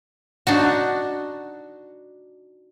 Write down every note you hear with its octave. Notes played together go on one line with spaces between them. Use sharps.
D4 D#4 F#4